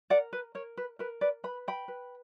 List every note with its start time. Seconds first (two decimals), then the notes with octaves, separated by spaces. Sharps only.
0.10 A#4 D5 F#5
0.33 B4
0.55 A#4 C#5
0.77 B4
0.99 A#4 B4
1.21 B4 D5
1.44 B4 B5
1.68 G5 B5
1.88 B4